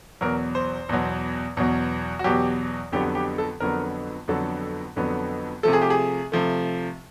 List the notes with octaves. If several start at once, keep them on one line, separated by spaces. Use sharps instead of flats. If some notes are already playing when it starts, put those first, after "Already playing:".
E2 B2 F#3 A#4
C5
E2 B2 F#3
E2 B2 F#3
F#4
E2 B2 F#3 G4
F2 D3 F#3 B3 G4
G4
A4
F2 D3 F#3 B3 A#4
F2 D3 F#3 B3 A4
F2 D3 F#3 B3
C3 F3 A3 A4
G#4
G4
G#4
C3 F3 A3